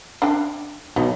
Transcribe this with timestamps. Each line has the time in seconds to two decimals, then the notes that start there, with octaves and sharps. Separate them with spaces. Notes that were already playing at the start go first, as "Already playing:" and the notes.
0.22 D4 G5
0.96 B1 B3